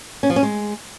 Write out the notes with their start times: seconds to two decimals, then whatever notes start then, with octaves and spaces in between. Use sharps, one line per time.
0.23 C#4
0.30 F3
0.36 C#4
0.43 G#3